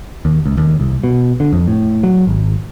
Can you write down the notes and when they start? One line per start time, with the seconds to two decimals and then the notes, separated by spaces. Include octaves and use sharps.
0.25 D#2
0.46 C#2
0.57 D#2
0.80 C2
1.04 B2
1.40 D3
1.53 F2
1.68 A2
2.03 F#3
2.27 G#1